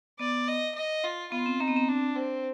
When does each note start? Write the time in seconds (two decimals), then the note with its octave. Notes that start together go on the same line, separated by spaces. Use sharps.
0.19 B3 D5
0.48 D#5
0.75 D#5
1.04 F4
1.32 B3 F4
1.46 C4
1.60 C4 D#4
1.68 B3
1.77 C4
1.88 D4
2.16 C4